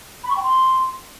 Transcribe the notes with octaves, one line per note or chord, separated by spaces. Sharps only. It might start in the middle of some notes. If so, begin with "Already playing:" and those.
B5
C#6
G5
C6